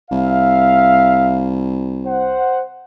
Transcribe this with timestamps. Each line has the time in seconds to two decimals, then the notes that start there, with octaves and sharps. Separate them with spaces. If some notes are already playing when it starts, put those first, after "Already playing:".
0.11 C2 E5 F5
2.06 C5 F#5